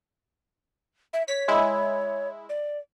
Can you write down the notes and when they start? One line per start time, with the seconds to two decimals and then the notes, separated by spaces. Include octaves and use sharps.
1.13 E5
1.28 C#5 B6
1.48 G#3 E4
2.49 D5